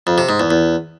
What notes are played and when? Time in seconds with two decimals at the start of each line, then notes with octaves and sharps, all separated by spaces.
0.07 F2
0.18 C3
0.29 G#2
0.40 E2
0.51 E2